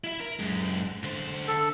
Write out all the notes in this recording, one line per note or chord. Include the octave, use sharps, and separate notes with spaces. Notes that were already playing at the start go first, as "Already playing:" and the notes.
E4 E5
A#4
F#2 G#3
D3 C5
A4